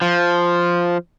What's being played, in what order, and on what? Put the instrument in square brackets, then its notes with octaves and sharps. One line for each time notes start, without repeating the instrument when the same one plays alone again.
[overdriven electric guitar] F3